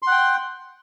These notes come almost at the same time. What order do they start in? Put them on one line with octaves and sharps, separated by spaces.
C6 F#5 G5